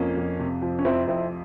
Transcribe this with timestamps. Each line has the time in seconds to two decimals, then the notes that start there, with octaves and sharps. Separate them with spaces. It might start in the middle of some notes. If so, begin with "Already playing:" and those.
Already playing: F2 C3 F3 A#3 C#4
0.17 F2
0.39 C3
0.62 F3
0.79 C#4
0.85 F2 C4 E4
1.07 F2 C4 E4